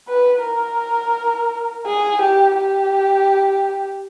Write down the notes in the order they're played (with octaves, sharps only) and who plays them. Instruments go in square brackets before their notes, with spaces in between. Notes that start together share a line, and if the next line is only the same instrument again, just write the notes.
[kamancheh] B4
A#4
G#4
G4
G4